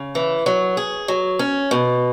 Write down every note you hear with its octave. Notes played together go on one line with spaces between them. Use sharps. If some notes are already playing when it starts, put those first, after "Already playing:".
Already playing: C#3
E3
F#3
G#4
F#3
C#4
B2